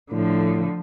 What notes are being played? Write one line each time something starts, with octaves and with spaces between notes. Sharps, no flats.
A2 D3 F3